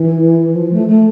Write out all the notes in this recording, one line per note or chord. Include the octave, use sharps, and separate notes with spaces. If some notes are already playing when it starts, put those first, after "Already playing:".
Already playing: E3
F3
A3
A3